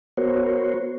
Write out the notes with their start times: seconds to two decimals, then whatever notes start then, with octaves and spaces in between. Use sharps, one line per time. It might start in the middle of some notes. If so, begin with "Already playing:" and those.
0.17 B3 F#4 A#4 C5 C#5